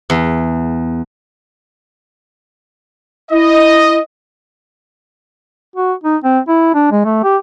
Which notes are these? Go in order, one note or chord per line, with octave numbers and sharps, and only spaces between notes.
E2
E4 D#5
F#4
D#4
C4
E4
D4
G#3
A3
G4